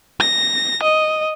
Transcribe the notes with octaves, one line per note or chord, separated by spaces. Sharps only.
A#6
D#5